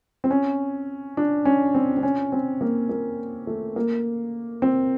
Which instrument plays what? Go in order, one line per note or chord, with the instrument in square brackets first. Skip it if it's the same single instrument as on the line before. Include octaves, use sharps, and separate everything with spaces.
[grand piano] C4
C#4
D4
C#4
C4
C4
C#4
C4
A#3
A#3
A3
A#3
C4